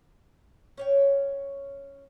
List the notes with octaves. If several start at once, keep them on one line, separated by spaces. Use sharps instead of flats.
C#4 C#5 G5